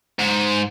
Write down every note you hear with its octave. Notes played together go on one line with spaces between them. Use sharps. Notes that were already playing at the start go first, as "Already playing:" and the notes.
G#2